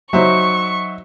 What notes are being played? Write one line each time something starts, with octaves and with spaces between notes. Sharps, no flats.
F#3 D#4 C5 E5 C#6